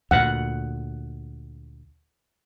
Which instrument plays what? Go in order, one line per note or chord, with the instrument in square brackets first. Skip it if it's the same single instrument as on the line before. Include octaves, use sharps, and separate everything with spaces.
[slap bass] D2 A#2 [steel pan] F#5